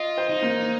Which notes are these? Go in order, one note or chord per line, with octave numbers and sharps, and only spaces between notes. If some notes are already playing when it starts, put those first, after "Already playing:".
Already playing: F4 D#5
C5
D#4
A#3